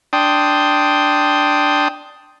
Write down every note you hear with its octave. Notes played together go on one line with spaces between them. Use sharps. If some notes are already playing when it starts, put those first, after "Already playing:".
D4 G5 C6 D#6